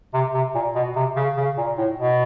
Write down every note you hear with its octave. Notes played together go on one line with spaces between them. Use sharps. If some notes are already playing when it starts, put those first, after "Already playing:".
C3
C3
A#2
B2
C3
C#3
C#3
A#2
A2
B2